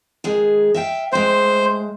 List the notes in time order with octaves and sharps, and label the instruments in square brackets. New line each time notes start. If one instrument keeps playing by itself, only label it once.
[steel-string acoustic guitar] D#3 G#3 G#4
E5 F5 G5
[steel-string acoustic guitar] A2 G#3 [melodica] C5